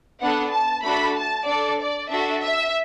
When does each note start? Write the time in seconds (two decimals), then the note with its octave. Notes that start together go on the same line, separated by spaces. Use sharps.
0.20 B3 D4 A4 F#5
0.52 A5
0.83 A3 D4 F#4 A4 B5
1.16 A5
1.47 D4 A4 D5
1.79 D5
2.10 D4 F#4 A4 E5
2.42 E5